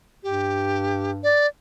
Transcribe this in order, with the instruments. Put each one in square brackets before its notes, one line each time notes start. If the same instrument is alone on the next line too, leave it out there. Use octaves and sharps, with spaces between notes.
[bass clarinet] G2 [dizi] G4
[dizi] D5